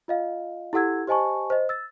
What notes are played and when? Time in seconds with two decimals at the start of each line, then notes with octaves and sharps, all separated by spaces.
0.08 F4 D#5 F5
0.73 E4 G4 A4 F#5 E6 G#6
1.07 G4 C5 D#5 G#5 A5 C#6
1.50 C5 D#5
1.69 E6 A6